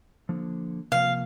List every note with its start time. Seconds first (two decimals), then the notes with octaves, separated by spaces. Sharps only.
0.29 D3 F3 A#3
0.92 C3 F3 A#3 F5